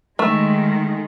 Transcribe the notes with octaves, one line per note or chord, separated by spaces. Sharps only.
D#3 G#3 A3